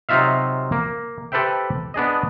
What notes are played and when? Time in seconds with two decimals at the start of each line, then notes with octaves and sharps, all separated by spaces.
0.09 C3 F#3 D#4 F4 E5 F5
0.72 A#3
1.32 G4 A4 B4 C5 E5 G5
1.94 B3 D4 G#4 D#5